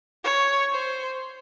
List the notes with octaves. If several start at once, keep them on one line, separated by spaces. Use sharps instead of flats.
C#5
C5